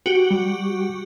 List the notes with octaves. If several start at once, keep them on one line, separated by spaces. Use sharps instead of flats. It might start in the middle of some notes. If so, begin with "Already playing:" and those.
F#4 G4
G3